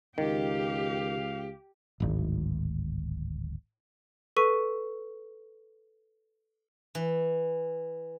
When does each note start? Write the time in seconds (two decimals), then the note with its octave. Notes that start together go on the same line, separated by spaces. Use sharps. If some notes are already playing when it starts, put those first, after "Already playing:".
0.18 C#2 D#3 G4 F5
2.00 D1 G#1
4.36 A4 B4 C#6 E6 B6 D#7
6.95 E3